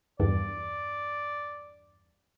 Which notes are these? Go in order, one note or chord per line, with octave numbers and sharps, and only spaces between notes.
E2 G2 D5